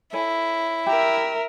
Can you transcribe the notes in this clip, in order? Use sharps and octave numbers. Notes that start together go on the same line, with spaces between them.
E4 A4 C#5 G#5
G4 A#4 E5